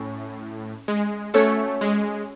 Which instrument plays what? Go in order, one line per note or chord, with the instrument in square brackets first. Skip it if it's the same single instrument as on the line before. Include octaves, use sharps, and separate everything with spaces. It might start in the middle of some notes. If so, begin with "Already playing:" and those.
Already playing: [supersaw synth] A2 [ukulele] C#4
[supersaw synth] G#3
[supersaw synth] A3 [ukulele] C#4 F#4 A4 C#5
[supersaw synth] G#3